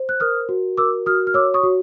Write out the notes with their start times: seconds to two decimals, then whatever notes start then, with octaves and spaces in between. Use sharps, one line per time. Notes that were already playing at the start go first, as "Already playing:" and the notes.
Already playing: C5
0.09 F#6
0.20 A#4 D#6 F6
0.49 F#4
0.78 A#4 D6 E6
1.06 F#4 D#6 F6
1.27 F6
1.34 C#5 D6 E6
1.54 C#6 D#6
1.63 F#4